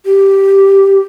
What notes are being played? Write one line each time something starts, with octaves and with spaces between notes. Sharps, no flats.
G4